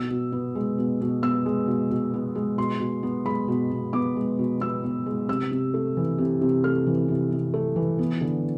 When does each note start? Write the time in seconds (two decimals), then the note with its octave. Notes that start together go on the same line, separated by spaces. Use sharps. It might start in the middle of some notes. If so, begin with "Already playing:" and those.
Already playing: B2 E6
0.11 B2
0.32 B3
0.55 G#3
0.78 B2
1.01 B2
1.22 B3 E6
1.46 G#3
1.68 B2
1.91 B2
2.14 B3
2.35 G#3
2.58 B2 C6
2.80 B2
3.03 B3
3.26 G#3 B5
3.48 B2
3.71 B2
3.93 B3 D6
4.16 G#3
4.39 B2
4.61 B2 E6
4.84 B3
5.06 G#3
5.29 C3 E6
5.51 C3
5.74 A3
5.97 E3
6.18 C3
6.41 C3
6.64 A3 F6
6.87 E3
7.09 C3
7.31 C3
7.54 A3
7.76 E3
7.99 B3
8.21 D3